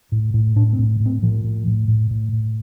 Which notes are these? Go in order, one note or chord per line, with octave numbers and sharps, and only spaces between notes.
A2
A2
A2 D4
C4
A2
A2
C4
A2 F3
A2
A2
A2
A2
A2